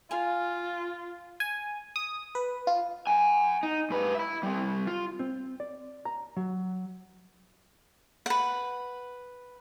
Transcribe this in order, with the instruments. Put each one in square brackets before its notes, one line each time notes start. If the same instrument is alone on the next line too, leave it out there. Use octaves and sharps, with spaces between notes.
[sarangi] F4 [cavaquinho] F5 G#5
[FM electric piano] G#5
D#6
B4
F4
[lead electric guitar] F#5 G#5
D#4
G#2 B4
E5 B5
G3 C4
F4
[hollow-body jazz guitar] C4
D5
A#5
F#3
[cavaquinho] B4 F#5